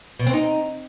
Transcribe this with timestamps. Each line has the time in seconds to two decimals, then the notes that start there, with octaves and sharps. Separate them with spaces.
0.19 B2
0.26 C4
0.33 D#4